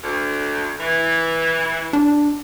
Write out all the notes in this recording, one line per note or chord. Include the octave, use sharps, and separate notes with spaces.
D2
E3
D4